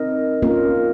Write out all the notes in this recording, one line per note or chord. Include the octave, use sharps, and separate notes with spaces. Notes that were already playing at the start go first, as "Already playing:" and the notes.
Already playing: C4 D#4 A#4 D#5
A#3 C#4 F4 A#4